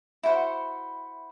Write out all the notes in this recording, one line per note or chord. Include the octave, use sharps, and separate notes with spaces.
E4 F#4 C5 F#5